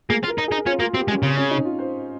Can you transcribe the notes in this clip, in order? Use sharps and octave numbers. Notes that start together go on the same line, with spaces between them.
A#3 G#4
F4
A#4
D#4
G#4
D#4
C#4 F4
A#3 F4
C4 G4
G#3
C#4
C#3 C4
C#4
D#4
F4
C5